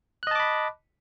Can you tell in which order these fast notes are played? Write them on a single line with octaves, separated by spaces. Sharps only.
F#6 D#5 A5 D6 B5